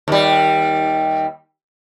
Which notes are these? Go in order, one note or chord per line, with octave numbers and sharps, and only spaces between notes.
D#2 G3